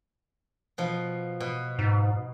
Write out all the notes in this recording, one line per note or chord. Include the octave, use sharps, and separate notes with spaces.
B2 F3
B2
G#2